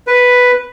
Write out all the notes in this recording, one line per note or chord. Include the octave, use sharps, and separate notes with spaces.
B4